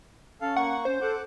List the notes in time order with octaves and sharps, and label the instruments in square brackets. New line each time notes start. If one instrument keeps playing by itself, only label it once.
[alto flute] C#4 [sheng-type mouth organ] A4 F5
[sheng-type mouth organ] A#3 C#6 [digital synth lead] F#5
[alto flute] C#4 [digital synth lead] C5
[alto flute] A4 [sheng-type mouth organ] F#5 D6